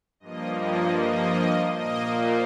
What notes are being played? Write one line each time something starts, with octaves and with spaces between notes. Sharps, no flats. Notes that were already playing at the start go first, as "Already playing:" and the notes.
G2 F3 A#3 D#5
D#5
D#5
A#2 A#3 D#5
C5